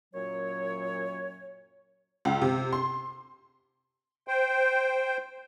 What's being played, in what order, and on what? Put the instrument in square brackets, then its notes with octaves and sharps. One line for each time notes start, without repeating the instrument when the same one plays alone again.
[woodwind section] F#2 A#2 F#3 C#5
[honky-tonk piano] C#2
C3
C6
[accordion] C5 G5